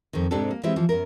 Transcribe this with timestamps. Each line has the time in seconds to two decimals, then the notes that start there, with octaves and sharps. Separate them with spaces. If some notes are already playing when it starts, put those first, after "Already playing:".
0.13 F2 D#3
0.31 G#2 C3 C4 D4 G4 A4
0.51 A#3
0.63 E3 G#3 C4 E4 G4 E5
0.76 E3 F3
0.89 F#2 B3 A#4